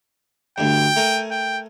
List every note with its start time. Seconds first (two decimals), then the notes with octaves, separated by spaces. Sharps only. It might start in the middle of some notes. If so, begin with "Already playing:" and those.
0.58 D2 G2 G5
0.96 A3 A#4 G#5
1.31 G5